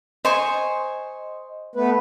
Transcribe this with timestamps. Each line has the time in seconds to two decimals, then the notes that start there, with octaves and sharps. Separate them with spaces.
0.25 C5 D#5 G#5 C#6
1.76 A3 B3 B4